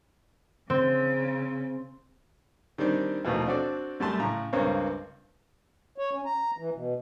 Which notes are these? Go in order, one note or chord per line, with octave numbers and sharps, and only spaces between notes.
C#3 C4
D#3 G3 C4 D4 D#4
D#2 B2 E3 F3 A3 A#3
C4 D4 F#4 A4 D5
F#2 G3 A3 A5 C6
A2 C#3 A#5
C#2 G2 A#3 C4 C#5
C#5
C#4
A#5
E3
B2